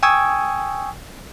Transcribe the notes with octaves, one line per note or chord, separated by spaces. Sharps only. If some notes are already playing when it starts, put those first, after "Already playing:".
G5 G#5 C#6 D#6 E6 G#6